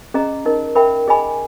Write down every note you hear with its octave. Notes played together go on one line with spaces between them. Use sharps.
C#4 G#4 D#5 A#5
D#4 A#4 D#5
A#4 E5 G5 B5
G#4 D#5 G#5 B5